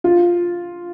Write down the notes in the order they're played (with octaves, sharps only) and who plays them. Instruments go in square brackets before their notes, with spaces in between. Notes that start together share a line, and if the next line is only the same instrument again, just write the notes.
[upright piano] F4